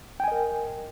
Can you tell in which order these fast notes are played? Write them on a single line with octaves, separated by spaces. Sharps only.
G5 G#5 D#5 A#4